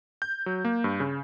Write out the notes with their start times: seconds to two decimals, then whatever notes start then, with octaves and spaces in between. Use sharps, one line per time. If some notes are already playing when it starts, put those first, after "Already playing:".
0.22 G6
0.46 F#3
0.65 A#3
0.84 G2
1.00 C#3